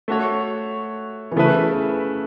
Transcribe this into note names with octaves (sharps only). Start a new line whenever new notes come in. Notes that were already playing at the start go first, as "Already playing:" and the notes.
A3 F#4 C#5
E3
C#3 A3 E4 B4